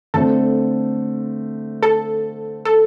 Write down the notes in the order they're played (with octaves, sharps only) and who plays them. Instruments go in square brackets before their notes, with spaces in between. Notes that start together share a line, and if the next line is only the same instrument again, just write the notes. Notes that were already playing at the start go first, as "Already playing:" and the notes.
[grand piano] D3 A3 C4 [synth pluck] A4
[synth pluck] A4
A4